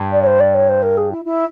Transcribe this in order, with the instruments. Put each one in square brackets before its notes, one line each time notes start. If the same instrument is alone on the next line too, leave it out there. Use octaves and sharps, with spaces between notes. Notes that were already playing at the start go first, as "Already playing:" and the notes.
Already playing: [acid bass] G2
[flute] D5
C#5
C5
D5
C#5
C5
A#4
G#4
E4
E4